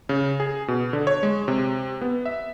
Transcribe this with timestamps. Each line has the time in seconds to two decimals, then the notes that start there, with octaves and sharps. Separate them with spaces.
0.09 C#3
0.40 G#4
0.68 B2
0.93 D3
1.07 C#5
1.23 G#3
1.48 C3
2.02 B3
2.26 E5